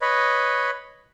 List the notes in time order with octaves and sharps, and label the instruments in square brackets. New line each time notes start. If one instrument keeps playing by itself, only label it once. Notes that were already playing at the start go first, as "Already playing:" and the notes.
[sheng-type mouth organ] B4 C#5 D#5 B5